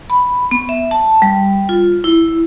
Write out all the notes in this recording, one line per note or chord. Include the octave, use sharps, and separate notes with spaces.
B5
B3
E5
A5
G3
F4
E4